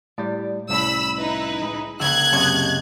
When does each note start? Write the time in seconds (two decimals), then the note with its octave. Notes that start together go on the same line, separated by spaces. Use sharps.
0.18 A2 G3 D5
0.69 C2 A2 C#4 B5 E6
1.17 D#4 E4 B4
1.61 G#3
2.00 C#2 A#3 E6 F#6 G#6
2.32 F#2 C3 C#5 D#5 A5